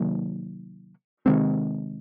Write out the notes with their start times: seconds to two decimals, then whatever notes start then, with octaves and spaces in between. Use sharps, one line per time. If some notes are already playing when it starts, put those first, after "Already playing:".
Already playing: C3 D#3 F#3 A#3
1.26 C3 D#3 G#3 C4